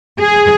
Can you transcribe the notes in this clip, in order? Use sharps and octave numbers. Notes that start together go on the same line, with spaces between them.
G#4